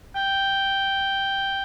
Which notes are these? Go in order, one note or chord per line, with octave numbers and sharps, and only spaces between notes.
G5